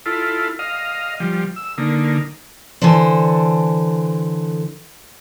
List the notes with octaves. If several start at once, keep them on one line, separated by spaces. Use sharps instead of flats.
E4 F4 A4
D#5 F5
F3 G3
E6
D3 A#3 D#4
D3 E3 A4 C5